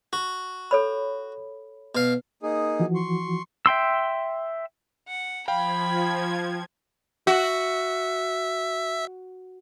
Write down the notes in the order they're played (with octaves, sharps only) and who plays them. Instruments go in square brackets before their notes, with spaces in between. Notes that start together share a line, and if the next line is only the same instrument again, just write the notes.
[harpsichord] F#4
[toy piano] A4 C#5 B5
[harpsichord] B2 F5
[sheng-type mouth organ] A#3 D#4 G#4
[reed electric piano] E3 F3 F#4
[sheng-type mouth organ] C6 C#6
[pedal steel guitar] E5 G5 C6 E6
[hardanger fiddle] F#5
[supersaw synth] F3 G#6 [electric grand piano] F5 G5 [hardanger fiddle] B5
[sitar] F#4 [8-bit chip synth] E5